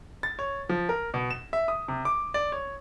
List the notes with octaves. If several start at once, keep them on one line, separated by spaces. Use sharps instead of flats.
A6
C#5
F3
A#4
B2
E7
E5
D#6
C3
D6
D5
C#5